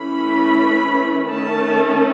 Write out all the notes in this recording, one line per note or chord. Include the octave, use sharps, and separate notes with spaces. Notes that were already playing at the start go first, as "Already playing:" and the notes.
Already playing: E3 A3 C#4 B5
D#3 A3 C#4 A5